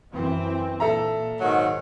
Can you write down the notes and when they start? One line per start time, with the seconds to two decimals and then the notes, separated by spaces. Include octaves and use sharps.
0.13 F#2 E3 C4
0.80 A#2 A4 E5 A#5
1.40 G#2 D#3 F#3